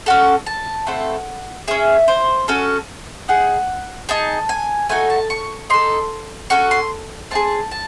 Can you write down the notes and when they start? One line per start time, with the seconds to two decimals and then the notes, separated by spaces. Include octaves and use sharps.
0.06 C#4 F#4 A4
0.46 A5
0.87 A3 C4 E4 A4 F#5
1.68 C#4 G#4 E5
2.08 C5
2.48 C#4 F#4 A4
3.28 D#4 G#4 F#5
4.09 D#4 G#4 A5
4.49 G#5
4.89 A3 D#4 F#4 G#5
5.10 A5
5.30 C#6
5.70 D#4 A4 C6
6.50 C#4 F#4 A4 C#6
6.71 C6
7.31 C4 D#4 G#4 A5
7.71 A5